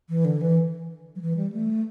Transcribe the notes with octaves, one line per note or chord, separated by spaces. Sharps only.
E3
D3
E3
F#3
E3
G3
A3